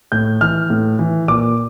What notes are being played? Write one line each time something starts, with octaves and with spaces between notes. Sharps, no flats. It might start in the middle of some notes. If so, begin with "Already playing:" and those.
A2 G6
E3 F6
A2
E3
A#2 D6